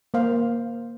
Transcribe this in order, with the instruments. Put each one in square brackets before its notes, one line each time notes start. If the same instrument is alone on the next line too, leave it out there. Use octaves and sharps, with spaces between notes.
[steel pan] A#3 C5 F5